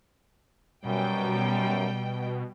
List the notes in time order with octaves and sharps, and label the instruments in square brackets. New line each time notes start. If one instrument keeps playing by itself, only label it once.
[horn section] F#2 [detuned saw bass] B2 [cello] G3 [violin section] G5